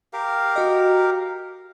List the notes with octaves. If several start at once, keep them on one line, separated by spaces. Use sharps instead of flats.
G4 A#4 F5
F#4 D#5